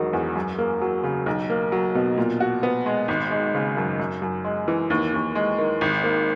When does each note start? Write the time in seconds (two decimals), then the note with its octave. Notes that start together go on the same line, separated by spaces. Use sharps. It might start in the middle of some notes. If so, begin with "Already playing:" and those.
Already playing: E1 D#3 F#3
0.13 E2
0.36 F#2
0.58 A#3
0.81 F#3
1.04 C#3
1.26 B1
1.50 A#3
1.72 F#3
1.95 B2
2.18 A#2
2.40 F#4
2.63 B3
2.86 G#3
3.08 G#1
3.31 G#3
3.55 C#3
3.77 F#2
3.99 F#2
4.22 F#2
4.45 G#3
4.68 E3
4.90 D#2
5.14 D#2
5.35 G#3
5.58 D#3
5.81 G#1
6.04 A#3